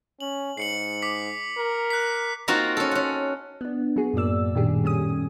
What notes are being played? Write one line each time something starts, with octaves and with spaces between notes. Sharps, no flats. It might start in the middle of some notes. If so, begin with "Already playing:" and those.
C#4 F#7
G#2 C7 C#7 F#7
D6 B6
A#4
F#6 B6
A#3 C4 D#4 F4 F#4
C#4 A4
C#4 F#5
B3 D4
F#3 B3 F#4 G#4
F#2 A2 F#3 A#3 D5 E6
A#2 D#3 G3 D4 G4 G#4
A3 C#4 G#5 D#6